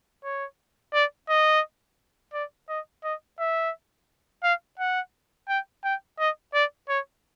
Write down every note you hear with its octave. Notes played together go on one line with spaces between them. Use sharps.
C#5
D5
D#5
D5
D#5
D#5
E5
F5
F#5
G5
G5
D#5
D5
C#5